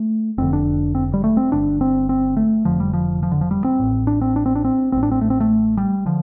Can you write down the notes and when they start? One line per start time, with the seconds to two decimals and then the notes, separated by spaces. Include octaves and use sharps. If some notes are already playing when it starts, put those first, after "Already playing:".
Already playing: A3
0.38 F1 F2 D3 C4
0.53 D4
0.95 C4
1.14 G3
1.24 A3
1.37 C4
1.52 G1 G2 D3 D4
1.81 C4
2.09 C4
2.37 A3
2.65 F1 F2 D3 F3
2.80 G3
2.93 F3
3.23 F3
3.32 D3
3.41 F3
3.51 G3
3.64 C4
3.80 A1 A2
4.07 D4
4.21 C4
4.36 D4
4.46 C4
4.55 D4
4.65 C4
4.92 A1 A2 C4
5.03 D4
5.12 C4
5.21 A3
5.30 C4
5.40 A3
5.77 G3
6.06 D3 F3